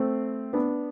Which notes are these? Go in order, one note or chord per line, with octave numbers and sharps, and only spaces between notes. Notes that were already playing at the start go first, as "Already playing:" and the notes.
Already playing: A3 C4
B3 D4